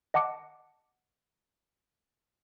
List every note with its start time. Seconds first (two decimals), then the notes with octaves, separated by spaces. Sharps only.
0.14 D#5 F#5 A5 D6 C#7